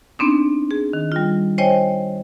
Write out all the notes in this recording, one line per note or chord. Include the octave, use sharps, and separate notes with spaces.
B3 C4 D4 D#4
G#4
D#3
G3 F4
C5 C#5 D#5 G5 G#5